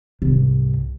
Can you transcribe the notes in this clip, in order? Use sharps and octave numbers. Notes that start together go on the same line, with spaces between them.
C2 G#2